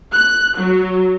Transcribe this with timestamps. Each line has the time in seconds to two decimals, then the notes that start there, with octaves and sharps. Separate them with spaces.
0.13 F#6
0.58 F#3